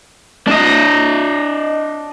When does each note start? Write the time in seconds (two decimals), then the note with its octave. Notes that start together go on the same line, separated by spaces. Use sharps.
0.47 D4 D#5